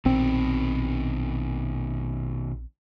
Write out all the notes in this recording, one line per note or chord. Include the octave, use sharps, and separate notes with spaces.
A#1 B2 D#3 C4